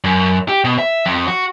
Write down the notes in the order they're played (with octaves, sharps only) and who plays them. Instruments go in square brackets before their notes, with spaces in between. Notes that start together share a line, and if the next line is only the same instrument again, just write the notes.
[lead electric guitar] F#2
G4
B2
E5
F2
F#4